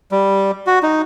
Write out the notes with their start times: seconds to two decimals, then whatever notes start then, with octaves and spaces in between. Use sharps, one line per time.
0.12 G3
0.67 F#4
0.83 D#4